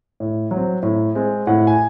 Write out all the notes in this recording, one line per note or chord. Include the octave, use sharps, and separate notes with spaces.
A2
F#3
C4
A2
G#3 C4
A2 F#5
G#5